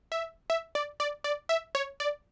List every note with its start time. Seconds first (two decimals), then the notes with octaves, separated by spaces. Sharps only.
0.12 E5
0.50 E5
0.75 D5
1.00 D5
1.24 D5
1.49 E5
1.75 C#5
2.00 D5